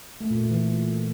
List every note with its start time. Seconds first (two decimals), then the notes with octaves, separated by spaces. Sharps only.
0.21 A3
0.31 A#2
0.41 A#2
0.51 E3